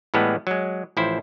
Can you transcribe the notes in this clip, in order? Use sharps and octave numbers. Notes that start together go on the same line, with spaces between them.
A2 E3 G3 G#3 B3
F#3 G#3
A1 F3 E4 C5